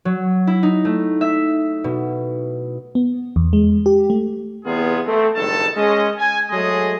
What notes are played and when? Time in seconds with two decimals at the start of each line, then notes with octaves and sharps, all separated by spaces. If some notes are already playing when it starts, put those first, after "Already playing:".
0.05 F#3
0.47 E4
0.63 D#4
0.85 A3
1.21 E5
1.84 B2
2.95 B3
3.36 E2
3.53 G#3
3.86 G4
4.10 A3
4.65 E2 C3 B3 F4 G#4
5.06 A3 C4
5.35 F#1 G2 D#3 A4 A5
5.76 G#3 C#4 D#5
6.18 G#5
6.50 F#3 G#3 A3 G#4 A4 D#5